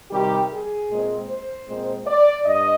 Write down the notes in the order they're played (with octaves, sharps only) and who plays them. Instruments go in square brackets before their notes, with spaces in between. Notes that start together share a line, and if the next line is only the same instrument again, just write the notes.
[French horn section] C3 D#3 G3 G4
G#4
A#2 G#3 C4
C5
A#2 G#3 C4
D5
G2 D#5